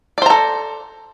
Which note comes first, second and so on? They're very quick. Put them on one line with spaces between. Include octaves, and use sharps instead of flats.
D5 C5 A#5 A4